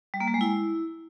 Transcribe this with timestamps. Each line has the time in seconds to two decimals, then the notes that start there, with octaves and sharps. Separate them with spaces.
0.14 G3
0.20 A#3
0.27 G3
0.34 G#3
0.41 E4